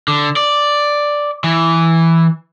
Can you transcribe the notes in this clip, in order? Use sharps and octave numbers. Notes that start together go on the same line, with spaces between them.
D3
D5
E3